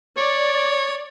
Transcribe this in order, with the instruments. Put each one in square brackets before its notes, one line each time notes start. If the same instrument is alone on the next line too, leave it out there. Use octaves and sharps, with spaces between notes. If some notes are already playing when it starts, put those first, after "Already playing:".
[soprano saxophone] C#5 [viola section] D5